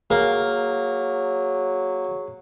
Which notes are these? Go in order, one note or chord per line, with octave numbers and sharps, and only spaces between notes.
F#3 A#3 G#4